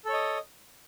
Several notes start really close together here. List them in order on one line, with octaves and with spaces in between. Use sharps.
A4 C#5 D#5